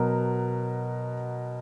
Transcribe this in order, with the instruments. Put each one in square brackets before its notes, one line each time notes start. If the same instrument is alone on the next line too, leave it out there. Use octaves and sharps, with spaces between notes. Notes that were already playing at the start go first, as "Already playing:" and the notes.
Already playing: [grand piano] B2 F#3 A#4